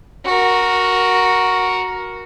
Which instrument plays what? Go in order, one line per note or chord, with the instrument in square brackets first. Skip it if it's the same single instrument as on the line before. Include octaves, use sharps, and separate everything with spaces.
[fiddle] F#4 A#4